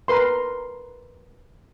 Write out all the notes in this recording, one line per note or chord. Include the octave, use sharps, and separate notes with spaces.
A#4 B4 C6